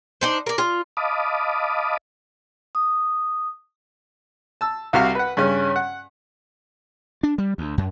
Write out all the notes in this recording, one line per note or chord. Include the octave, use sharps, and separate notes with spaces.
D4 D#4 C5
A#4 D5
F4
D#5 F5 A5 B5 D6 D#6
D#6
A5 E6
C2 C3 F#4 F5 F6
B4 F#5
G2 C#3 C#4
F#5
D4
G3
D2
F#2